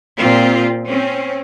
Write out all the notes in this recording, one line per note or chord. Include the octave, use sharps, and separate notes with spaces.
A#2 C4 F4 G4
C4 C#4